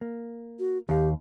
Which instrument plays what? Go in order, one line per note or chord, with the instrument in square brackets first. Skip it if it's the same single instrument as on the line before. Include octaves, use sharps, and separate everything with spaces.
[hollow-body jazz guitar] A#3
[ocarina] F#4
[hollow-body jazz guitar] D#2 F5 [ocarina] G4